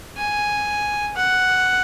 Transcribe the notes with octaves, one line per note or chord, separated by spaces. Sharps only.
G#5
F#5